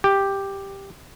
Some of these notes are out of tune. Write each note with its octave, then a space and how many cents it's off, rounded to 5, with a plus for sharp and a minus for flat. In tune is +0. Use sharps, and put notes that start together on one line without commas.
G4 +5